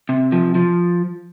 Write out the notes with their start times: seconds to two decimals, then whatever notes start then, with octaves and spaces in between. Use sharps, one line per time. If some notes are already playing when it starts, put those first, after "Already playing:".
0.09 C3
0.32 F3
0.55 F3